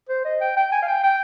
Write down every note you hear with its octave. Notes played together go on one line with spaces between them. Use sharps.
C5
D#5
G5
G5
G#5
F5
G5
G5